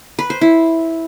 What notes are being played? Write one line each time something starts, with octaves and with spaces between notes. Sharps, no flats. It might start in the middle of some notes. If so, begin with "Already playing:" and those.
B4
C5
E4